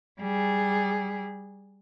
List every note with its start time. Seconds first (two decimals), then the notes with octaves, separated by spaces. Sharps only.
0.20 G3 G#4